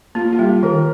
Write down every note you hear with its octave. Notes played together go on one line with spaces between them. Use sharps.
A#3 F4
F4
G3 G4
D#3 A#4